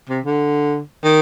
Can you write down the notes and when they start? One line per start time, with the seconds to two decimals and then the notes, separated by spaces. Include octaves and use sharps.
0.09 C3
0.25 D3
1.04 D#3